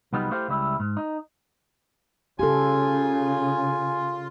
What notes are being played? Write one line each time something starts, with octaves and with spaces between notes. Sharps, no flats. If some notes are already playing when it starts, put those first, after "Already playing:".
C2 F#3 G3 B3 D#4 F4
A3 E4 G4 C5 F5
C#2 G3 E4 E5
G#2
D#4
C#3 F4 G4 A4 G#5